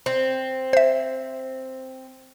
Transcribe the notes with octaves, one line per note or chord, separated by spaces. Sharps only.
C4
C5 E5